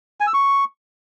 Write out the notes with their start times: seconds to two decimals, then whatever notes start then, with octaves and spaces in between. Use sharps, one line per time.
0.20 G#5
0.27 E6
0.34 C#6